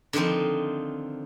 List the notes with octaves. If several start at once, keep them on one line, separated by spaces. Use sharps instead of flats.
D3 D#3 F3 C4 D#4